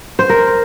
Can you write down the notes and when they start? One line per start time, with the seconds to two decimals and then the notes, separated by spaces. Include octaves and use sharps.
0.19 C5
0.29 A#4